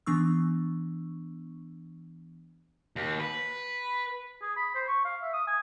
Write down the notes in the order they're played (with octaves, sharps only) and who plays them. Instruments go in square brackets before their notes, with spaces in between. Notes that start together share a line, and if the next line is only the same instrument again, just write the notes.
[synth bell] E3 B3 D4 C#6 E6
[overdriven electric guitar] D#2
B4
[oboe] G#4
B5
C5
C#6
F5
E5
D#6
G#5